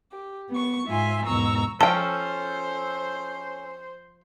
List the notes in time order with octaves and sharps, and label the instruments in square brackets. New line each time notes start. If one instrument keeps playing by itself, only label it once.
[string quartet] G4
B3 C#6
G#2 F4 E5 G#5 C6
E2 G#2 B2 A#5 C#6 E6
[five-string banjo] F3 G5 [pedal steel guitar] C#4 A4 [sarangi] C5 [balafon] A5